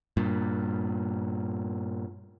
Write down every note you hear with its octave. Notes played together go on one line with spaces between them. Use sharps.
G2 A#2